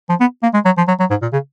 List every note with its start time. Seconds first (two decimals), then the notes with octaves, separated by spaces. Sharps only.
0.09 F3
0.20 B3
0.43 A#3
0.54 G#3
0.65 F#3
0.77 F3
0.88 F#3
1.00 F#3
1.10 G#2
1.22 A#2
1.33 C#3